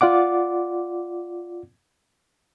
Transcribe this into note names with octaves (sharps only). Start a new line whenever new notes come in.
F4 D5 F#5 D6